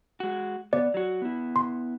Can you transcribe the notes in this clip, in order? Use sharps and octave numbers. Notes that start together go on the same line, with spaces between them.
G#3 F#4
B3 D5
F#3 F#4
B3 E4
C6